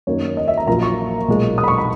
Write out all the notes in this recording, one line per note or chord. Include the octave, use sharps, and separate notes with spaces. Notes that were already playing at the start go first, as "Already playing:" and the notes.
F#2 D#3 A#3 C#5
D#5
E5
A#5
A#1 A#2 F#3 A#3 A#5
C#6
B1 A#2 G#3
D#6
B5
C#6
B5